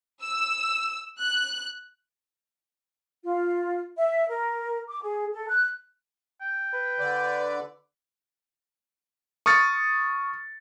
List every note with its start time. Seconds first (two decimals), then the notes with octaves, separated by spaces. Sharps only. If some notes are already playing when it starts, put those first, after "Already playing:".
0.22 E6
1.20 F#6
3.24 F4
3.97 E5
4.29 A#4
4.89 D6
5.02 G#4
5.33 A4
5.49 F#6
6.41 G5
6.73 B4
7.00 D3 D5
9.46 C#6 D#6 F6 A6 C#7